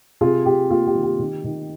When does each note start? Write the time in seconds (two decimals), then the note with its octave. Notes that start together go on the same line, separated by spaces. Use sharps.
0.21 C3 F4 G#4
0.46 C3 G4
0.70 A#3 F4
0.87 G4
0.95 D#3
1.03 G4
1.19 D#3
1.44 D#3